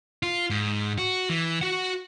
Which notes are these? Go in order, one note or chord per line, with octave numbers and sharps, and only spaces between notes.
F4
G#2
F#4
E3
F#4 F#5